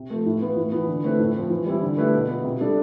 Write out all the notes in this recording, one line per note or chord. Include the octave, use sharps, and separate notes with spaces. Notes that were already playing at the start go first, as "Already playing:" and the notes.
Already playing: C3
F3 A3
A2
E3 B3 F4 B4
A2
E3 B3
D3
A3 C4 E4 B4
A2
F3 C4
E3
G3 C4 E4
D3
A3 E4 G4 B4
B2
B3 F4
C3
G3 D4 A4